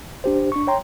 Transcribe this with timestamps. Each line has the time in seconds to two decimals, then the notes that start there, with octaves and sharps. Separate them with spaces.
0.24 D4 G4 C5
0.52 D4 C#6
0.67 C#5 G5 A#5 C6